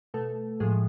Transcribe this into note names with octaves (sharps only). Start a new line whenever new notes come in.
B2 A3 A4
A2 F3 G#3 G#4